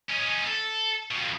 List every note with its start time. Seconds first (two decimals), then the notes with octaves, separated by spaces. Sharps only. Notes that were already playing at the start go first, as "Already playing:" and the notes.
0.10 C#4 D#4
0.46 A4
1.11 F2 B2